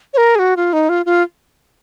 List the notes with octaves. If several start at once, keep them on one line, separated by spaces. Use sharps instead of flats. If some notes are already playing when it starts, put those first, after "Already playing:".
C#5
A#4
G#4
F#4
F4
D#4
F4
F4